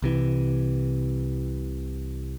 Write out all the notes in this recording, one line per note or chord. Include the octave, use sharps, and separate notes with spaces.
C2 C3 E3